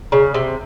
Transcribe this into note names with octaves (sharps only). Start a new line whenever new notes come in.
C#3
C3